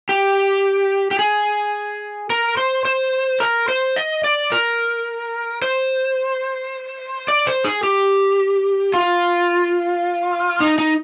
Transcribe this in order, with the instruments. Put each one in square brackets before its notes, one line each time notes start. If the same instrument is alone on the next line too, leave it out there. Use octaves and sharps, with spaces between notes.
[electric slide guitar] G4
G4
G#4
A#4
C5
C5
A#4
C5
D#5
D5
A#4
C5
D5
C5
G#4
G4
F4
D#4
D#4